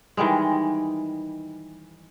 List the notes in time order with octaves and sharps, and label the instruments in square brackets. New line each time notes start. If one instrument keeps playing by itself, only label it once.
[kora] D#3 E3 G3 G#3